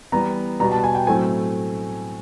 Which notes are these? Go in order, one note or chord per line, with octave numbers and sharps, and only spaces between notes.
E3 G3 B3 A#5
B2 G3 B3 A#5
A5
G#5
G5
A2 F#3 A3 C4 G#5